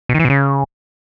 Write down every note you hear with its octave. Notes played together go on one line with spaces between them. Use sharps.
B2
D#3
E3
B2
C#3